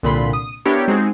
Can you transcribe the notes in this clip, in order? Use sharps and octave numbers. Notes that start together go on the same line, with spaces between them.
C2 A#2 D3 B5 C6
D#6
B3 D4 E4 G4 A#4 C#5
G#3 C4 D#4 F#4 G#4